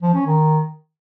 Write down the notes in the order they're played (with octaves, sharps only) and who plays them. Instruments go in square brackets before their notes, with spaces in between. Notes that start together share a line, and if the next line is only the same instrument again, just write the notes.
[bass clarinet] F3
C#4
D#3